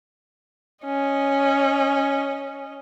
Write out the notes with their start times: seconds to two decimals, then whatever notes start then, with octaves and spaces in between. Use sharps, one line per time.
0.85 C#4 D#5